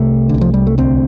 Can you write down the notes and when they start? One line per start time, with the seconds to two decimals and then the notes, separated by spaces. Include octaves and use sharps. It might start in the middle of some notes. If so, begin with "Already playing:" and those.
Already playing: C2 C3 A3
0.29 C2 D3
0.41 F3
0.54 G3
0.67 A3
0.78 D2 C4